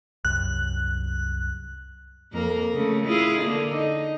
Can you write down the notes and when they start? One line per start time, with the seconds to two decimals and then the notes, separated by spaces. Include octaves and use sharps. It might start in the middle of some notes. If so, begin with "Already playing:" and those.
0.25 C2 F#2 F#6
2.33 F2 A#3 A#4
2.74 C#3 A3
3.07 E4 F4 G#4
3.42 D3 A#3
3.74 D#4